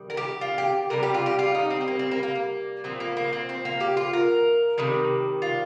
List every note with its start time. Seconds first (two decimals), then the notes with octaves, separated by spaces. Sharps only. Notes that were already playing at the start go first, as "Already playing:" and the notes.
Already playing: C3 D#3 G3
0.10 A#4
0.17 G4
0.41 F4
0.58 G4
0.90 C3 G3 A#4
1.03 G4
1.14 F4
1.26 G4
1.39 F4
1.55 D#4
1.70 C4
1.81 C4
1.88 A#3
1.99 C4
2.11 A#3
2.23 A#3
2.35 A#3
2.84 A#2 F3 C4
3.00 A#3
3.17 A#3
3.33 C4
3.49 C4
3.65 A#3
3.80 G4
3.97 F4
4.13 A#4
4.78 C3 D#3 G3
5.42 F4